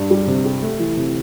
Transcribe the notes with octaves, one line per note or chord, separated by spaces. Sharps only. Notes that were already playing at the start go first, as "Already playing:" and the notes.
Already playing: G2 D4
G3
C3
G4
A3
E3
C3